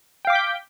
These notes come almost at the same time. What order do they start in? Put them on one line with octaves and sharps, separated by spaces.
G5 F5 D6 B6 G6